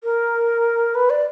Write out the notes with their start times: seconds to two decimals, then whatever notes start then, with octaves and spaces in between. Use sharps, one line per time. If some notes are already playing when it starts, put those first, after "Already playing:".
0.04 A#4
0.95 B4
1.10 D5